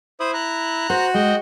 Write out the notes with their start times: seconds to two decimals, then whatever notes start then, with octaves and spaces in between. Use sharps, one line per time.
0.20 E4 C5 D#6
0.34 A#5 F#6
0.90 F#4 C5
1.14 G#3 D#5 G5